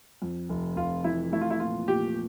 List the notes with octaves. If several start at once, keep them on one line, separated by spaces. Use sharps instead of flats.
F2
F1
F1 F4
E3 E4
A3 E4
F4
E4
A#2 F4
A#2 G4